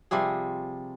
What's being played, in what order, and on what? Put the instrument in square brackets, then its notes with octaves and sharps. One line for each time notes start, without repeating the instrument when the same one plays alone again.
[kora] C3 F3 G3 G#4